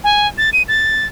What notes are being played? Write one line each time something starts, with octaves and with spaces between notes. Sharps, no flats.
G#5
A6
D#7
A6